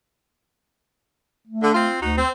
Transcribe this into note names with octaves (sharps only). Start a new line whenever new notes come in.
A3
D3
C4 F4
D2 D#4 F#4
C4